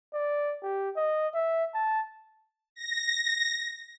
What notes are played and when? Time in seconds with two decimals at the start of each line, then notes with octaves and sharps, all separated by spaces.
0.14 D5
0.63 G4
0.96 D#5
1.34 E5
1.74 A5
2.75 A#6